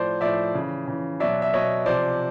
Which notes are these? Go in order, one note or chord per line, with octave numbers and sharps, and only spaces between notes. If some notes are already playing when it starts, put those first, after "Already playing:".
Already playing: A2 F3 C5 D5
A2 F3 D5 E5
C#3 E3
C#3 E3
B2 F#3 D5 E5
E5
B2 F#3 C#5 D#5
C3 F3 C5 D5